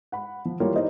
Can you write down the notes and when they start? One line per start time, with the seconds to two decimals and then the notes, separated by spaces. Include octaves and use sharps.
0.12 F#5 B5
0.45 F3
0.60 E3 G3 A#3 F4 A#4 C#5
0.76 D#4 E4 G4 C5 D5 D#5